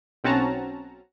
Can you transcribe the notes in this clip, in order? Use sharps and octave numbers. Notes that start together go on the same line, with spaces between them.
B1 C4 C#4 F#4 A5 A#5